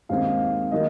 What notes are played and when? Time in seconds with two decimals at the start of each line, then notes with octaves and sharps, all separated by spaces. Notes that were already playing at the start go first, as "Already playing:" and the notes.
0.09 D#2 D#3 G#3 C4 D#4 F5
0.71 D#3 F#3 A#3 D#5